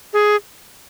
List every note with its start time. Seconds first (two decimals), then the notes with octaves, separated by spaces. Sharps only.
0.13 G#4